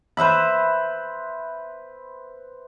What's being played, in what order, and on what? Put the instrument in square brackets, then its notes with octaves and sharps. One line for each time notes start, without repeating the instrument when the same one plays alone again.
[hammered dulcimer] B4 C5 E5 B5